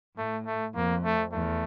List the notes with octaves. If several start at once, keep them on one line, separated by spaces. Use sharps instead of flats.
A2 A3
A3
F2 A#3
A3
E2 A3